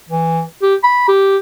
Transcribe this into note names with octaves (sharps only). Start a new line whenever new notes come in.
E3
G4
B5
G4